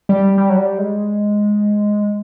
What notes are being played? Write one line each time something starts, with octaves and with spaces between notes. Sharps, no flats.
G3
G3
F#3
G3
G#3